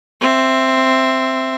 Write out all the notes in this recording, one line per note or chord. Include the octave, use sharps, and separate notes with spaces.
C4 E5